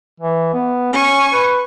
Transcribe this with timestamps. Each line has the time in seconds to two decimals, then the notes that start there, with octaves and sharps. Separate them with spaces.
0.20 E3
0.53 B3
0.93 C#4 G#5 C#6
1.33 B4